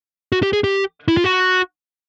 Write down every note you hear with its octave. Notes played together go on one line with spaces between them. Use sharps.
F#4
G4
G#4
G4
E4
F4
F#4